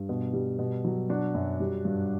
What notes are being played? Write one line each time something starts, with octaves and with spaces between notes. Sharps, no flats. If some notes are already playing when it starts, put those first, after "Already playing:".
Already playing: G2
B2
G3
B2
F#3
F#3 D4 F#4
F#2
G3
G2